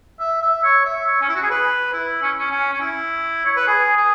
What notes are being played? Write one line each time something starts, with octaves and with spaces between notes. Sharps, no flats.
E5
E5
C#5
E5
C#5
C#4
E4
F#4
G#4
B4
E4
C#4
C#4
C#4
C#4
E4
C#5
B4
G#4
G#4